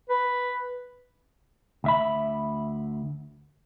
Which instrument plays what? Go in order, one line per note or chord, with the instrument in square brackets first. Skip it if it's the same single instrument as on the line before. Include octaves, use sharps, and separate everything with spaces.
[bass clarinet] B4
[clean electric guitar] D2 E5 B5